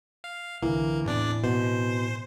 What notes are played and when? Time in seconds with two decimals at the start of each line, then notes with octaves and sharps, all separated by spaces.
0.24 F5
0.62 C2 D3 E3 A#3
1.06 E2 A2 C4 D4 D5
1.44 B2 C5